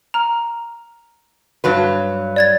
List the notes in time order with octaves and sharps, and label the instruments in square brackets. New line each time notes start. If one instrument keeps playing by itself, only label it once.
[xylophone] A#5 F6
[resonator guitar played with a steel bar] G2 F#3 B4
[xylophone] D5 G#6 A6